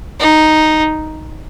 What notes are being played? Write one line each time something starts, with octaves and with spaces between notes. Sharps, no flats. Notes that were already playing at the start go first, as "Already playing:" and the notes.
D#4